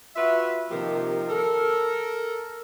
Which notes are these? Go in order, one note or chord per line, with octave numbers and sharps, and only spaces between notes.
F4 F#4 B4 E5
C3 D#3 F3 A#3 G4 A#4
A4 A#4